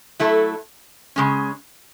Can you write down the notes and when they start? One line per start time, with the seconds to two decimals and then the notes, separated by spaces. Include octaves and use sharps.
0.19 F#3 A3 E4 A4
1.16 C#3 G#3 C#4